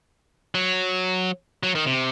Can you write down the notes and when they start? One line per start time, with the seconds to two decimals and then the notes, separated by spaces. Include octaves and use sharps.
0.55 F#3
1.63 F#3
1.75 D#3
1.86 C3